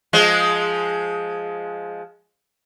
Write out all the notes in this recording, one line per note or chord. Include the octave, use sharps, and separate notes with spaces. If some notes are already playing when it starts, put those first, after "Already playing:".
F3 G#3